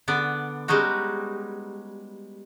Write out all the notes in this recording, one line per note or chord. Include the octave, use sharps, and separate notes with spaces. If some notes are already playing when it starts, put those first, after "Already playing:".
D3 B3 D5
G3 G#3 C#4 D#4 F#4